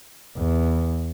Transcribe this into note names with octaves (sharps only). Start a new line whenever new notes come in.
E2